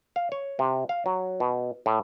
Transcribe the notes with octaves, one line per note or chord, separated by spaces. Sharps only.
F5
C#5
C3
F5
F#3
B2
A2